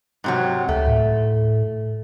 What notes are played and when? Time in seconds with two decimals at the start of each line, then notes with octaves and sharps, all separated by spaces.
0.24 G#2 C3 F#3
0.69 D2 A3
0.87 A2